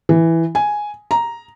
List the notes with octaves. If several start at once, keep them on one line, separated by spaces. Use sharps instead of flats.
E3
G#5
A#5